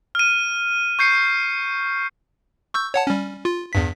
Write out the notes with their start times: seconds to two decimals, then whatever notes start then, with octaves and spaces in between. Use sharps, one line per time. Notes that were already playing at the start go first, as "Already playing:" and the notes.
0.15 F6 D#7
0.99 C#6 G6 C7 C#7
2.74 C#6 E6 G6
2.94 C#5 F#5 A5
3.07 G3 C#4
3.45 F4
3.73 E2 G2 B6